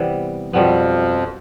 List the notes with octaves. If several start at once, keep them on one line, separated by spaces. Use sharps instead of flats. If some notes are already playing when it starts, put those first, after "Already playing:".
Already playing: C3 E3 G3 B3
F2 B2 F3 G3 B3